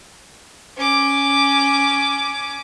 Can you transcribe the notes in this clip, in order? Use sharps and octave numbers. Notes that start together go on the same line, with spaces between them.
C#4 D6